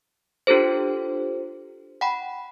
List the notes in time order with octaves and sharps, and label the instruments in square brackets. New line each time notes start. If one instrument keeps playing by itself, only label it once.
[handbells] D4 F4 G4 A4 C5
F#5 G5 B5